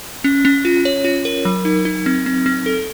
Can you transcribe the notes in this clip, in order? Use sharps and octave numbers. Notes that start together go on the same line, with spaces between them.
C#4
C#4
F4
C#5
F4
A#4
F#3
D#4
D#4
C4
C4
C4
A4